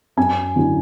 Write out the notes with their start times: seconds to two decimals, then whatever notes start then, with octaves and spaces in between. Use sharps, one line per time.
0.17 F#2 G#5
0.56 D3 F#3 C#4 E4